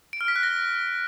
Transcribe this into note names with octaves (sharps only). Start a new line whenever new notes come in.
D7
F6
B6
F#6
A#6